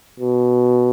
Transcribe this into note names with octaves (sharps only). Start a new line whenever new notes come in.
B2